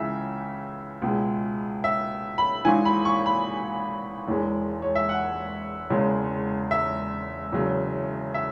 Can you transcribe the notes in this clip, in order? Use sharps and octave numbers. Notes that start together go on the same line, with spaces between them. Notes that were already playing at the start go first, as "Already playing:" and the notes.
Already playing: C#2 C#3 E3 G#3 E5
C#2 B2 G#3
E5
B5
G#1 G#2 E3 G#5
B5
C#6
B5
E1 E2 E3 G#3
C#5
E5
F#5
E1 E2 C#3 G#3
E5
E1 E2 C#3 F#3
E5